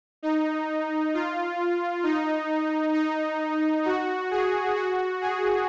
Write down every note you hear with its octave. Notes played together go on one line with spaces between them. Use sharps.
D#4
F4
D#4
D#4
F#4
G#4
F#4
G#4